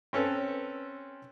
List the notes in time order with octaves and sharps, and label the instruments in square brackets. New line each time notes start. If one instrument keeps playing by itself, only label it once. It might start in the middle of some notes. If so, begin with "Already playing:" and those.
[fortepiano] C4 C#4 A4 B4